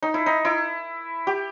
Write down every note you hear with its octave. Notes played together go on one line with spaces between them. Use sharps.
D#4
E4
D#4
E4
G4